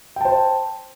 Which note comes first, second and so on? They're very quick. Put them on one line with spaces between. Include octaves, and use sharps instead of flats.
G5 A5 C5